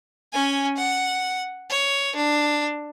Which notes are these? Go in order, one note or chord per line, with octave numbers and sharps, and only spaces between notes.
C#4 G#5
F#5
C#5
D4